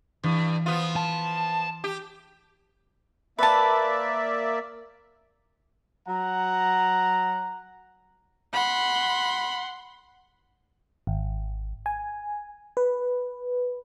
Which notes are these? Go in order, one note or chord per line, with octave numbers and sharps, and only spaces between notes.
G2 E3
F3 B3 F4
A5
G4 D#7
A#3 B4 D5 E5 A5
F#3 F#5 A#5
F#5 B5 C6
G#1
G#5
B4